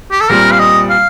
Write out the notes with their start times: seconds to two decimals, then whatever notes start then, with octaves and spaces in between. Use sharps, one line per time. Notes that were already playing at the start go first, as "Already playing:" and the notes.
0.12 G4
0.21 A4
0.29 A#2 G3 C4 A#4
0.51 F5
0.60 D#5
0.90 F5